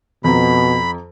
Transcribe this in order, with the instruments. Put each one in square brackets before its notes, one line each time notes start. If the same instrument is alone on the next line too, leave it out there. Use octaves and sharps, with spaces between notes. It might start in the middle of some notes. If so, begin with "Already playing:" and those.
[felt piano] F2 A#5 [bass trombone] B2 [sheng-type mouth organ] B5